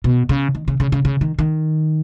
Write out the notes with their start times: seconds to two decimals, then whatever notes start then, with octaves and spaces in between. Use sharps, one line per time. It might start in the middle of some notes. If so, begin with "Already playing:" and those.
0.04 B2
0.29 C#3
0.55 D#3
0.68 C#3
0.80 C#3
0.92 C#3
1.05 C#3
1.21 D#3
1.39 D#3